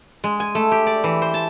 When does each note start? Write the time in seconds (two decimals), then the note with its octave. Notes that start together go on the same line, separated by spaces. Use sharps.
0.24 G#3
0.40 G#5
0.55 A3
0.72 G4
0.87 D5
1.04 E3
1.22 C5
1.34 A5